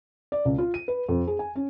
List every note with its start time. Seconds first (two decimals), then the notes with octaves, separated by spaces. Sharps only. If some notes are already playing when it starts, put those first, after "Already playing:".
0.32 D5
0.45 C#2
0.58 F4
0.74 D#7
0.88 B4
1.08 F2
1.27 G#4
1.39 G#5
1.56 C#4